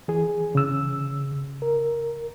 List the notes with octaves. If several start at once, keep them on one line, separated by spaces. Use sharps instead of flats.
E3 G#4
C#3 E6
A#4